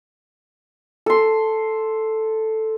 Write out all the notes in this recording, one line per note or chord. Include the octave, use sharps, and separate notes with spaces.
A4 C6